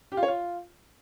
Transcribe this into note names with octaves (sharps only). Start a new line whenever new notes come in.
G4
F4
C#5
F4